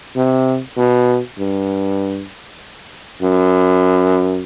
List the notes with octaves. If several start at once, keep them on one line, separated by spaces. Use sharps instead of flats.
C3
B2
G2
F#2